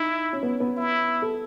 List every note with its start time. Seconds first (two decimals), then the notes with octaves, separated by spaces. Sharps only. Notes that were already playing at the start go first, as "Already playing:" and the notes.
Already playing: D#4 E4
0.33 C#4
0.43 B3
0.60 B3
0.77 E4
1.22 A4